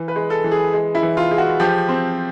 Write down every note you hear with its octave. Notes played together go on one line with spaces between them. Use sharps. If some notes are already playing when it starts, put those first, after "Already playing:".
Already playing: E3
B4
G#3
A4
E3
G#4
G#3
E4
E3
F4
G#3
F#4
F3 G4
C4